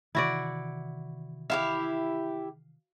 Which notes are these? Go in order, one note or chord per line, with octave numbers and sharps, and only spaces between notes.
C3 D#3 E3 E4 F#4 D5
E4 F4 G4 F5